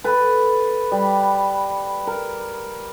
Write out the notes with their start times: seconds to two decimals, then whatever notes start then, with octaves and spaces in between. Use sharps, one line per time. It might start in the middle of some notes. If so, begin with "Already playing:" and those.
0.04 A4 B4
0.91 G3
2.07 A#4